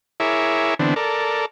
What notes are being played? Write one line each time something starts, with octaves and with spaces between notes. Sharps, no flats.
E4 G#4 A#4 C#5 E5 D6
D3 E3 B3 C4 D4
A4 A#4 D5